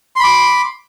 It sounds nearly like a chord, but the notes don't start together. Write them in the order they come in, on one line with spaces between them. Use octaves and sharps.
C6 B5 D6